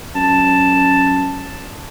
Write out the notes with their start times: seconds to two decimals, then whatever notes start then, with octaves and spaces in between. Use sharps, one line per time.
0.15 F#2 A5